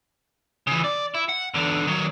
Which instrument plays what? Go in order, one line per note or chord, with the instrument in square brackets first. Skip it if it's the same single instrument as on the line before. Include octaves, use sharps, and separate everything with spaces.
[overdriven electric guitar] C#3 E3
D5
E4
F#5
E2 D3
D#3 F#3